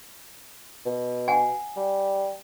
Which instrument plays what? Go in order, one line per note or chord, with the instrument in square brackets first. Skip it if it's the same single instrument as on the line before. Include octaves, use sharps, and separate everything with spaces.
[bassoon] B2
[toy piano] F#5 G#5
[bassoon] G3